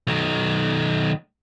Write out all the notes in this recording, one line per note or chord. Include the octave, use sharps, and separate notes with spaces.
B1 D#3